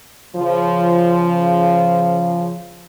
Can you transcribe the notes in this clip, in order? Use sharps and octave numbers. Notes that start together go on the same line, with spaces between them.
C#3 F3